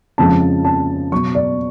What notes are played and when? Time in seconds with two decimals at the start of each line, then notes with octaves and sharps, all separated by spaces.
0.18 F2 C#3 F3 G#3 A5
0.65 A5
1.12 B2 F#3 C#6
1.35 D5